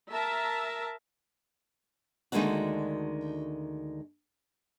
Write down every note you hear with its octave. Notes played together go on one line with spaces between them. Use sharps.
A#4 E5 A5
D2 D#3 G#3 A#3 D4 F#4